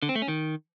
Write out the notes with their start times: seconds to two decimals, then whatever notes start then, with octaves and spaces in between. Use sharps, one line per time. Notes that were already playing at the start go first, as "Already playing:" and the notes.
0.02 D3
0.09 C4
0.15 A3
0.22 C#4
0.28 D#3